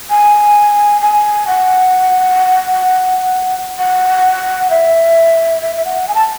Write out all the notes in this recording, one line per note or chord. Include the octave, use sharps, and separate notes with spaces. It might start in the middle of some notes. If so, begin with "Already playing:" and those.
G#5
G#5
F#5
F#5
E5
E5
E5
F#5
G#5
A5